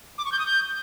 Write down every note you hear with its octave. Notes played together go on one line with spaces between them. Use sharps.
D6
C#6
G6
D#6
G6